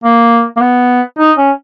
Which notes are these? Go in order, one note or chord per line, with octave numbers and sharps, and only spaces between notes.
A#3
A#3
B3
D#4
C#4